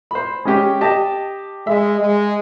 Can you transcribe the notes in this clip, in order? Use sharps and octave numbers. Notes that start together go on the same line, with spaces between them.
C5 B5
G#3 C#4 G4
G4 D#5 A5
G#3 E5
G#3